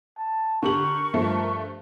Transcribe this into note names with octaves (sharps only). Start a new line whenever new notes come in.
A5
D3 G4 A#4 C#6 F#7
G2 F3 A3